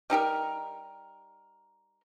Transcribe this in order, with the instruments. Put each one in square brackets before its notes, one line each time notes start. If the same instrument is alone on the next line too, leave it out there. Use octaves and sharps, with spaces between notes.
[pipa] G3 D#4 G4 A#4